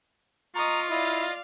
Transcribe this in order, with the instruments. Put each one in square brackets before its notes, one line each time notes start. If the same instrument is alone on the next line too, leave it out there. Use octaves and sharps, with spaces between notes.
[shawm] F4 [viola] D#5 C#6 [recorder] A#5
[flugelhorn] E4 [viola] D5 F5 [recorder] D#5